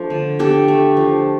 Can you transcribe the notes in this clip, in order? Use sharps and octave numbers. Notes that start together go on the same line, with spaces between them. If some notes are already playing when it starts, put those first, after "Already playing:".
Already playing: F3 A3 D4
D3
D4 G4 A4
A3
F3